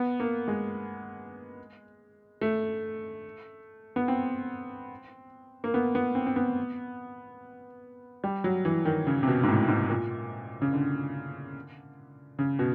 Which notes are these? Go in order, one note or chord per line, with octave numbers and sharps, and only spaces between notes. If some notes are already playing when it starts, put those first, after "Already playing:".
Already playing: B3
A#3
G#3
A3
B3
C4
A#3
B3
B3
C4
C4
B3
G3
F#3
E3
D#3
C#3
C3
B2
G#2
A2
G#2
A#2
C#3
D3
C#3
B2